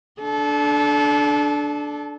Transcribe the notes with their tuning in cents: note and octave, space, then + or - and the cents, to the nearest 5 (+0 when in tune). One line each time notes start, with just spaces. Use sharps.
D4 +0 A4 -30